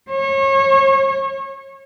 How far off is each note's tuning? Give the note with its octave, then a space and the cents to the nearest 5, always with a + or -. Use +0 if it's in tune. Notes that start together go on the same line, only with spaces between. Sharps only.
C#5 -30